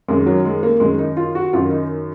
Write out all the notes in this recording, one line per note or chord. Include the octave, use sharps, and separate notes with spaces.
F#2 D#3 G#3
F#3
G#3
A#3
F#2 D#3 G#3
D#4
F4
F#4
F#2 D#3 F4
D#4